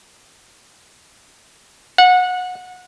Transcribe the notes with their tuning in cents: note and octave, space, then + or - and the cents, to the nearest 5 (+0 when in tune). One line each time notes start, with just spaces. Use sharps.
F#5 -25